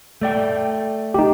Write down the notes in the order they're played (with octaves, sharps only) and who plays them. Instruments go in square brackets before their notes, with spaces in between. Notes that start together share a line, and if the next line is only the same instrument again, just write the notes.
[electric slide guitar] A3 D5 G5
[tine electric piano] D#4 G4